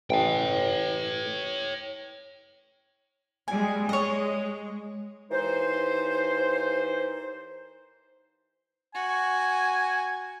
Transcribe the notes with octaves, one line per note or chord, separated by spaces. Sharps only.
A1 C#5 G5
G3 G#3 G#5
G#3 C#5 D#5
D#2 E3 D#4 C5
F#4 G#5